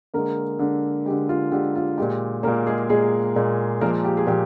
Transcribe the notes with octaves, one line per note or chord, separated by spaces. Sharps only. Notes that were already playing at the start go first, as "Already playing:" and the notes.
D3 G#3 A#3 A#4
D3 G#3
G#3 G4
D3
F4
D3 G#3 G4
F4
A#2 G#3 G4
A#2 G#3 A#3 A#4
G#3 G#4
A#2 G#3 G#4
A#2 G#3
A#2 F3 G#3 A#3 A#4
G4
G#4
A#2 F3 G4